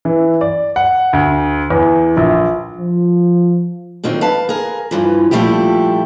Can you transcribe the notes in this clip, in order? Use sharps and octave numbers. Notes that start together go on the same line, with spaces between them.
E3
D5
F#5
D2
E2
A#1
F3
A#2 D3 D#3 F#3 C4
B4 F5 A5
G#4 A#4
G2 E3 F3
A#2 F3 G3 A3 E4 G4